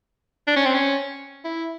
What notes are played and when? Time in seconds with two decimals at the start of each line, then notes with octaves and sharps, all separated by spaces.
0.47 D4
0.56 C#4
0.65 C4
0.74 C#4
1.45 E4